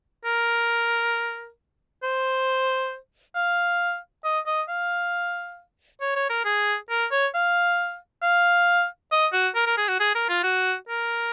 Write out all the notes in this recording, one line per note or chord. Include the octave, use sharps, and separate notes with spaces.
A#4
C5
F5
D#5
D#5
F5
C#5
C#5
A#4
G#4
A#4
C#5
F5
F5
D#5
F#4
A#4
A#4
G#4
F#4
G#4
A#4
F4
F#4
A#4